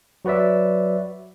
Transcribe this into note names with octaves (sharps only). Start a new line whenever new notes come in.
F#3 F#4 B4 D5 E5